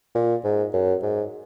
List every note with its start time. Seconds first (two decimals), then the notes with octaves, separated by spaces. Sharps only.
0.15 A#2
0.44 G#2
0.74 F#2
1.03 G#2